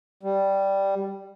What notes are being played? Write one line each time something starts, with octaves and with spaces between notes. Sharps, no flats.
G3